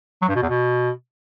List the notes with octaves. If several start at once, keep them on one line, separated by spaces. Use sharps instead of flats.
F#3
G2
B2
E2
B2